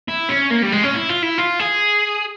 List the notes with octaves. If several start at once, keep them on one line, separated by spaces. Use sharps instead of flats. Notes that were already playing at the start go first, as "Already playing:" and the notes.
E4
C#4
A#3
G3
G#3
C#4
E4
F4
E4
F4
G#4